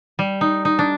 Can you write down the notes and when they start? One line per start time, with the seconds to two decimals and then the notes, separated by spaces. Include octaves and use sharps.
0.19 G3
0.41 D#4
0.65 D#4
0.79 D4